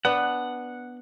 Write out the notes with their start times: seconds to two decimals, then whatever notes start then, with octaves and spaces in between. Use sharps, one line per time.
0.05 B3 D4 F#5